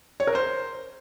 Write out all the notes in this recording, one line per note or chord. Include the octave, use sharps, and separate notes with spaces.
C#5
A#4
C5